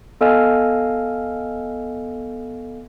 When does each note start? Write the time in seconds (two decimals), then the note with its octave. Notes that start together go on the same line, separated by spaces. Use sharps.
0.21 B3 A4 D#5 F5 G#5 F6